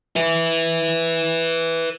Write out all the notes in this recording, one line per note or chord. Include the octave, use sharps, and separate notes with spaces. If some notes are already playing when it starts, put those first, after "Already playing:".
B4 E5